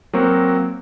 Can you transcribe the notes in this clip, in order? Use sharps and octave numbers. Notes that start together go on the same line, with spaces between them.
F#3 A#3 C4 F#4 A#4 C5